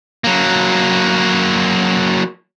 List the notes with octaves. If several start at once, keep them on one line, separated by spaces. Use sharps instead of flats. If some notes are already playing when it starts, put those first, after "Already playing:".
F#3 A#3